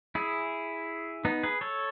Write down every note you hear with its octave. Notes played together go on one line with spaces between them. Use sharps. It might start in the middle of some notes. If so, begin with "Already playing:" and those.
E4 G#4
B3 D#4
G#4 B4
A4 C#5